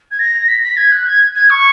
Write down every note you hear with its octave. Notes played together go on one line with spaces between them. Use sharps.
G#6
A#6
B6
B6
G#6
F#6
G#6
G#6
C#6